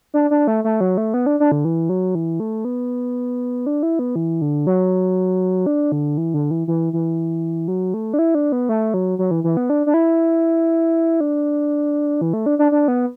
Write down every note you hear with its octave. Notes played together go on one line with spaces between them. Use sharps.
D4
D4
A3
A3
F#3
A3
B3
D4
D4
D3
E3
F#3
E3
A3
B3
D4
E4
B3
E3
D3
F#3
D4
D3
E3
D3
E3
E3
E3
F#3
A3
D4
E4
D4
B3
A3
F#3
F#3
E3
E3
B3
D4
D4
E4
D4
E3
A3
D4
D4
D4
B3